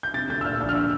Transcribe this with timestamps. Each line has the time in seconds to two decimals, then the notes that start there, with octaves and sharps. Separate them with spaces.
0.03 G6
0.13 C3 A6
0.29 D2 G6
0.41 E6
0.44 A#2 F6
0.61 A#1
0.69 F6
0.75 E6